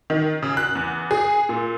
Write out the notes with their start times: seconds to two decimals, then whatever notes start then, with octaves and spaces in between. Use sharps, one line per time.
0.10 D#3
0.43 C#3
0.57 F#6
0.75 E2
1.11 G#4
1.49 A#2